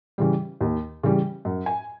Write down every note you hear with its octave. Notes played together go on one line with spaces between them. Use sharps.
C#3 E3 G3
D#2
C#3 E3 G3
F#2
G#5